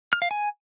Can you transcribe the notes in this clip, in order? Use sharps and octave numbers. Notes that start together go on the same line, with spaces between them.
F6
F5
G#5